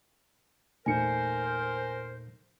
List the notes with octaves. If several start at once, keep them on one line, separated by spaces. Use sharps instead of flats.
E2 A#2 A3 D#4 A#4 C5 G#5 C#7